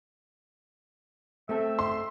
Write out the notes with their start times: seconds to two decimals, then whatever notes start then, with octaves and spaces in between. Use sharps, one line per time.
1.49 A3 C4 A4 E5
1.79 C6